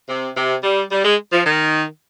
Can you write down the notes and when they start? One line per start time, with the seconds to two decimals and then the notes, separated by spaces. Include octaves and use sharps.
0.09 C3
0.36 C3
0.63 G3
0.91 G3
1.05 G#3
1.32 F3
1.46 D#3